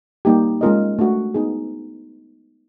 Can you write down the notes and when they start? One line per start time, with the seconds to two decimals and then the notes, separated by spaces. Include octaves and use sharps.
0.25 G3 A#3 D#4 G4
0.61 G#3 C#4 F4 A#4 D#5
0.99 A3 D4 F#4
1.34 B3 D#4 G#4